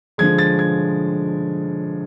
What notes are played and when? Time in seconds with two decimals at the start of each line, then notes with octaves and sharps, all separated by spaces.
0.18 D3 F3 G#3 G#6
0.38 A6
0.59 G#6